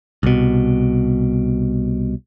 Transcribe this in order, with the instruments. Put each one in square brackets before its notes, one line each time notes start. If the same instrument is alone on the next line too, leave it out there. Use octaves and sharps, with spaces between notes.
[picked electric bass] C2 B2